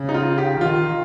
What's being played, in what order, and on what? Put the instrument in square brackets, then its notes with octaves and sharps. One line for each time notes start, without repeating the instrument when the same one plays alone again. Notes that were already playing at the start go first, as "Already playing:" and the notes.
Already playing: [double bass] C#3
[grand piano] D#4
F4
G4
[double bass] D#3 [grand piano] F4